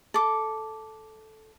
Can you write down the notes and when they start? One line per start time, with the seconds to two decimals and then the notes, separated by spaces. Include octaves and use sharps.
0.14 A4 D6